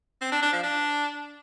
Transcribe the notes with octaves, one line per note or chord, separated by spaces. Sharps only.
C4
D4
D4
F3
D4